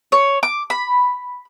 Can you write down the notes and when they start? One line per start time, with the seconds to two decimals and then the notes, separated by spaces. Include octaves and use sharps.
0.12 C#5
0.43 D6
0.70 B5